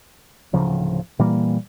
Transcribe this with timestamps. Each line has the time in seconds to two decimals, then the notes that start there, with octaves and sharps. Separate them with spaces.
0.53 D1 C#3 F3
1.19 A#2 E3 G3 A#3